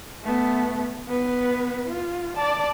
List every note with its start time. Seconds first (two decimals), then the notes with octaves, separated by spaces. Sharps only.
0.24 A3 B3
1.07 B3 B4
1.88 F4
2.36 D5 A5